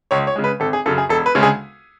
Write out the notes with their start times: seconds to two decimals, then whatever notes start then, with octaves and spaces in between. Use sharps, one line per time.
0.11 C#2 C#5
0.27 C#5
0.36 C#3 G#3
0.44 B4
0.60 G#1 A4
0.73 G#4
0.86 F#2 C#3 A4
0.98 G#4
1.09 E1 A4
1.26 B4
1.35 D2 C#3 G#3
1.43 G#4